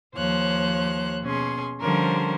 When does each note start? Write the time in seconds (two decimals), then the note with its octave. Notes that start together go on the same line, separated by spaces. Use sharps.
0.15 D#2 F3 C5 C#5 F#6
1.23 B2 C#4 G#4 C6
1.81 D3 F3 G3 C#4 A#4 C5